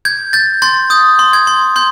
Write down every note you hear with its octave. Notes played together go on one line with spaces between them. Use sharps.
G6 G#6
G6 A6
C6 G6 A6
D#6 G6
C6
G#6
C6
C6 G6